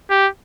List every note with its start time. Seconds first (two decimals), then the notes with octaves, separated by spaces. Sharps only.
0.10 G4